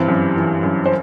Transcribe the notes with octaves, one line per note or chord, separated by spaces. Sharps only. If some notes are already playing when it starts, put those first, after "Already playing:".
Already playing: G2 E3 C4
F#2
E3
F#2
C5